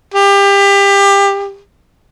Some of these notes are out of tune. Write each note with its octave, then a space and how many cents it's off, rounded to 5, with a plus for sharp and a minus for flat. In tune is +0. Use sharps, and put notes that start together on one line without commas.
G4 +25